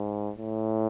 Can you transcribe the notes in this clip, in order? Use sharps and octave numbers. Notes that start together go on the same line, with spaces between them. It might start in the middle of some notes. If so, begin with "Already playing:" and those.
Already playing: G#2
A2